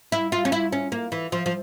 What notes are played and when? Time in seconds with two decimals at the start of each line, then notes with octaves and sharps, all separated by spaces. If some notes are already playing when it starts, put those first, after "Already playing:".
0.12 E4
0.32 F4
0.45 C#4
0.52 E4
0.72 C#4
0.92 A#3
1.12 E3
1.32 F3
1.46 F3